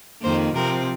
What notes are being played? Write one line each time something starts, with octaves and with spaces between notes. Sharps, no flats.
F2 D#3 A#3 C5
C3 F3 C4 A#4